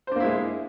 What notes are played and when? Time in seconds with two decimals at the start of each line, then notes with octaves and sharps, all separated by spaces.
0.07 C5
0.12 D4
0.16 A#3
0.20 E4
0.24 G#3